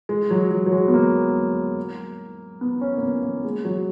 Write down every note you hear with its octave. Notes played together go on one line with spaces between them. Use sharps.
G#3
F#3
F#3
F#3
G#3
B3
A#3
B3
C#4
A#3
B3
A#3
G#3
F#3